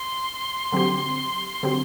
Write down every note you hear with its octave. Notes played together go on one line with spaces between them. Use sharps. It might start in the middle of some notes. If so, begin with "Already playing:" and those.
Already playing: C6
D3 F#3 C4 G4
D3 F#3 C4 G4